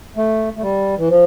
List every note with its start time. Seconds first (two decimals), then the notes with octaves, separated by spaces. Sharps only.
0.17 A3
0.57 A3
0.62 G3
0.98 E3
1.10 F3